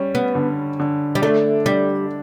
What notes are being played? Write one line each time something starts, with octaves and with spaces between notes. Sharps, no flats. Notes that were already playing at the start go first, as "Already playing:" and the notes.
Already playing: G3 C#4
B3
D3
D3
G3
A3 D4
G3 D4